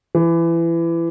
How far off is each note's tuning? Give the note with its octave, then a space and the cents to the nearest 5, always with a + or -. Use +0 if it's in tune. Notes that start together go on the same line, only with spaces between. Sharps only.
E3 +25